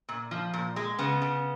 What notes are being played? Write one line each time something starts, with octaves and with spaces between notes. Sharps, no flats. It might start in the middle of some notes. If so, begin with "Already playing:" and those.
A#2
F3
A#2
G#3
C#3 B3
C#3